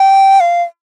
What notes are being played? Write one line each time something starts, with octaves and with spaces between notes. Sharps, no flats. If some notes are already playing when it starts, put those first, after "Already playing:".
Already playing: G5
F5